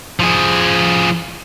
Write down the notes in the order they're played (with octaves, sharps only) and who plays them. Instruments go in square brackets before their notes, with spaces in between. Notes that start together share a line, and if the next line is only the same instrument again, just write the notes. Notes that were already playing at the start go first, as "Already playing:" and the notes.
[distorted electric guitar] F3 G#4